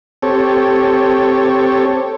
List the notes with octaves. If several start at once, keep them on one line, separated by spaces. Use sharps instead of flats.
C4 G4 A4 C#5